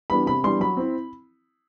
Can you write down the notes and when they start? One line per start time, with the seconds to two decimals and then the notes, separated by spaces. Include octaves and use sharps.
0.10 E3 G3 B3 D4 B5
0.26 C3 B5
0.43 E3 G3 B3 D4 C6
0.60 F#3 B5
0.77 C4 E4